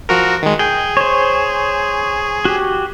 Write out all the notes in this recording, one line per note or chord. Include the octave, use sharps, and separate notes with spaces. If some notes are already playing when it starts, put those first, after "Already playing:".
F3 F#4 A#4
D#3 G#3
G#4 G5
C5 C#5
F#4 G4